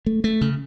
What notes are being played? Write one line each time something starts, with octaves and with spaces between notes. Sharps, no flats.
A3
A3
C#3